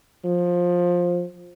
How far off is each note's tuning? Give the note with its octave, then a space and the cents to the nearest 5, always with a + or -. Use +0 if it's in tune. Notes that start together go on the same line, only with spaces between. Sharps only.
F3 +15